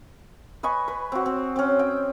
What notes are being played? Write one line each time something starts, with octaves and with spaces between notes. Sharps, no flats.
B4 D#5 G#5 C#6
B4
C4 F#4
C4
C4 C#4
G5